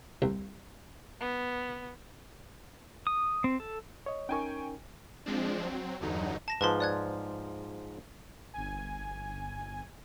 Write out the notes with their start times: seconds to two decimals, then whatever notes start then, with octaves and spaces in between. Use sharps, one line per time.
0.22 C2
1.21 B3
3.07 D#6
3.44 C4
3.60 A4
4.06 C#5 D#5
4.29 C#4 D#4 A#4 G5 G#5 C#6
5.26 F3 G#3 C4 D4
5.62 F#3 C4
6.01 E2 G2 D3 F#3 D#4
6.48 A5 A#6 E7
6.61 G#2 F3 B4 A5 C6
6.80 D5 F#6 G#6
8.54 G1 G#5